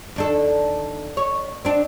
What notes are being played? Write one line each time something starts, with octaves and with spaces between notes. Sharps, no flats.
D#2 D4 A4
C#5
C4 D4